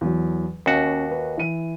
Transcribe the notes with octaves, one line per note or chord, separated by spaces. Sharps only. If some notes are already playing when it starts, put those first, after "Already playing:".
E2 F#3
D#2 C#4 F#4
B4
E3 D#7